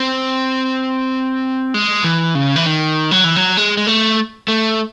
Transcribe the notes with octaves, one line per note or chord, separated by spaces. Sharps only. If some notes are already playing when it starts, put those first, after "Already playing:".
Already playing: C4
G#3
E3
C#3
E3
D#3
F#3
E3
F#3
G#3
G#3
A3
A3